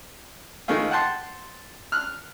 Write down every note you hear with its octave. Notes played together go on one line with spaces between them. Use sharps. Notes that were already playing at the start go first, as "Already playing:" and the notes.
D#3 G#3 A3 C#4 F4
F#5 G5 A5 C6
F6 F#6